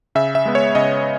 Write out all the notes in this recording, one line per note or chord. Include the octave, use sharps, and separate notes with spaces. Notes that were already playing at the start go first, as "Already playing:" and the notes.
C#3 E5
E5
G#3 B3
C#5
C#3 D#5